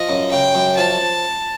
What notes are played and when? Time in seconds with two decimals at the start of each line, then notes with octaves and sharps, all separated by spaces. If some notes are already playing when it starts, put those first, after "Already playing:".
Already playing: F3 D#5
0.09 F#2
0.31 C#3 G5
0.54 F#2
0.77 F3 A5